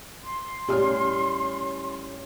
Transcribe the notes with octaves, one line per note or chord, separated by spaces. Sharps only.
C6
A2 G3 C#4 G4 F6